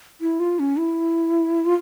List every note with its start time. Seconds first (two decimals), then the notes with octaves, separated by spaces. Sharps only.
0.21 E4
0.40 F4
0.59 C#4
0.79 E4
1.65 F4